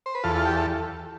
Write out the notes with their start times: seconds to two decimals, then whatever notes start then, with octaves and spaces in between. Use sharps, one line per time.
0.06 C5
0.15 B4
0.24 E2 F4 A4
0.36 F4
0.45 G4
0.56 A4